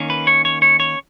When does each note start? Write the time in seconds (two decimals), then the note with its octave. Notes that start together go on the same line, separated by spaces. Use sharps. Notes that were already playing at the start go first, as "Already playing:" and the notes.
Already playing: D#3 A#3 C#4
0.10 B4
0.27 C#5
0.45 C#5
0.62 C#5
0.80 C#5